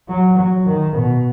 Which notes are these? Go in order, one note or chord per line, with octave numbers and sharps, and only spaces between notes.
F#3
F#3
D#3
B2